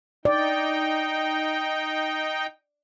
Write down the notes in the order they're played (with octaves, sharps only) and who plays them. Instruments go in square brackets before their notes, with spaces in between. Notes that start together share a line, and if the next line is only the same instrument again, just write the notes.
[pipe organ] D#4 G5 [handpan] D5